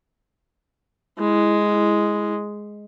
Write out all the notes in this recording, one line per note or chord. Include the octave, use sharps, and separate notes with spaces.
G#3 E4